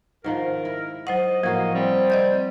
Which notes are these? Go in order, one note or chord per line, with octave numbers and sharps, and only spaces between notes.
G#2 D#3 F3 A#4
E4
F#3 C5 D#5 F#5
A2 F3 A#3 F#4 F5
G3 C4
D5 D#5 G6